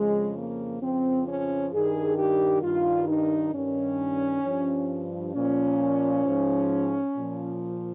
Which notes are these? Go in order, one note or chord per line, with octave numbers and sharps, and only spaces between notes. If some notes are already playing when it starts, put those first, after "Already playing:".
Already playing: F2 C#3 F3 G#3
A#3
F2 C#3 F3 C4
C#4
G2 D#3 G#4
G4
G2 D#3 F4
D#4
G2 D#3 C#4
G2 F3
A#2 F3 C#4
G#2 F3
A#2 F3